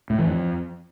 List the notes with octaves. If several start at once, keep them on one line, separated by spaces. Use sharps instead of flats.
A2
E3
F2